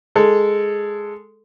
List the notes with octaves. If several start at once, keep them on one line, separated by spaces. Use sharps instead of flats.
G#3 A4